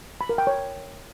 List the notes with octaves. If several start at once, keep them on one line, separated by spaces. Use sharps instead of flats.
B5
A#4
G5
C#5